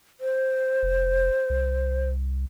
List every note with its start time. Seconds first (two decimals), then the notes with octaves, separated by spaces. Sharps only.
0.21 C5
0.83 F1
1.50 C2